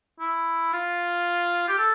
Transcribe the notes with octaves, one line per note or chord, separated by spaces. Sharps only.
E4
F4
G4
A4